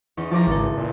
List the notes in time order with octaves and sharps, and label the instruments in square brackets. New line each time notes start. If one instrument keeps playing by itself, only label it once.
[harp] E2 C#4 D#4
[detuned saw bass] F3 [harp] A#5 D6 A6
[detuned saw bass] G#1 [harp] C#2 A4
[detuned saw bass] A#2